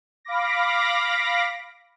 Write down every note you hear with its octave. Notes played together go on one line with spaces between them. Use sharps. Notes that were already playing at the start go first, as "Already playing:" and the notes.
F5 B5 D6 A#6